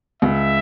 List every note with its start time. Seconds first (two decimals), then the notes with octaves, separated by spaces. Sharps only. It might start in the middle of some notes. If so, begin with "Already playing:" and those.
0.22 C#2 E5